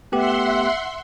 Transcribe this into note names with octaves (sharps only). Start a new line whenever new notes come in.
A3 B3 G4 E5 F#5 C6